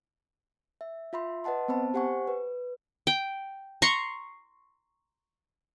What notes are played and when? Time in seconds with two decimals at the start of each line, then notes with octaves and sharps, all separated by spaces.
0.81 E5
1.13 F4 E5 B5 C6
1.44 B4 D#5 F#5 A5 C6
1.68 B3 C4 C5 A5 B5
1.94 G4 C5 F#5 G#5 C#6
2.27 B4
3.07 G5
3.82 A#5 C6 C#6